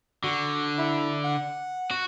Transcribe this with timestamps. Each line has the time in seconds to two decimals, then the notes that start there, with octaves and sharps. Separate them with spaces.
0.24 D3 F#4
0.78 E4
1.24 F#5
1.91 F#4